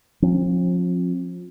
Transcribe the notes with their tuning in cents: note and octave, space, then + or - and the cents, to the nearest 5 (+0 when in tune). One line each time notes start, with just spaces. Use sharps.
F3 +25 C4 +40